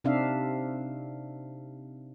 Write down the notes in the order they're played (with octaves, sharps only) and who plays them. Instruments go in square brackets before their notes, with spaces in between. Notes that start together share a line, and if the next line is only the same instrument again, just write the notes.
[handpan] C3 C4 D4 D#4 E5 F5